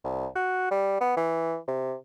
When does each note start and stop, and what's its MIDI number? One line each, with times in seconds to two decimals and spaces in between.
0.04 0.27 36
0.35 0.69 66
0.71 0.99 55
1.01 1.13 59
1.17 1.58 52
1.67 1.95 48